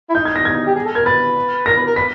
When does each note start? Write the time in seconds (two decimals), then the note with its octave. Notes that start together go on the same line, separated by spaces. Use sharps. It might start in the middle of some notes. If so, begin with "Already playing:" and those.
0.10 E4
0.15 D#4 G6
0.25 G#6
0.36 A#6
0.45 G#6
0.67 G4
0.76 G#4
0.85 A4
0.95 A#4 G#6
1.05 B4 A6
1.66 A#4 A#6
1.77 B4
1.87 A#4
1.96 B4 B6